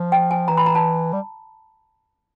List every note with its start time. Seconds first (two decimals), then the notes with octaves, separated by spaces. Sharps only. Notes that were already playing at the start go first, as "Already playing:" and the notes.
Already playing: F3
0.12 G5
0.31 G#5
0.48 E3 A#5
0.57 B5
0.66 A#5
0.75 A5
1.13 G3